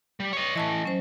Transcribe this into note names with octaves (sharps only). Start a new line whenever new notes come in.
G3
C#5 D#5
A2 E3 D#5 A5 C#6
F#3 C#4 C5